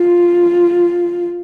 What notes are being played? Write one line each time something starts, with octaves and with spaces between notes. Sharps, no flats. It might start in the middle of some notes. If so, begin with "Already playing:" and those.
Already playing: F4